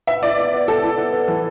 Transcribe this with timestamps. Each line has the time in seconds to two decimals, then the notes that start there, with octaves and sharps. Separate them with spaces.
0.07 B4 E5
0.22 E4 D5
0.38 B3
0.53 B3
0.68 B3 A4
0.83 E4
0.97 B3
1.13 B3
1.28 E3